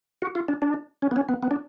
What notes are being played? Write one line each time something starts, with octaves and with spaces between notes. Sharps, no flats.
F#4
F4
D4
D4
C#4
B3
C#4
B3
B3
D4